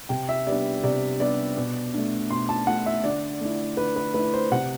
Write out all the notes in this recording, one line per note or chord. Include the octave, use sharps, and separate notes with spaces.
C3 G5
E5
G3 B3 D4 D5
C3 D5
G3 B3 D4 D5
B2
A3 D4
B2 C6
A5
A3 D4 F#5
E5
D3 D5
A3 E4
D3 B4
B4
A3 E4 B4
C5
C3 F#5